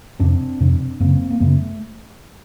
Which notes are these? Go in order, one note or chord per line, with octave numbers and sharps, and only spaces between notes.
F2 C3 C4 D4
F2 C3
F#2 C#3 A#3 C4
A#3
F#2 C#3 A3 B3